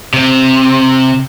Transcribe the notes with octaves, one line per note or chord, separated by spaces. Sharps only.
C3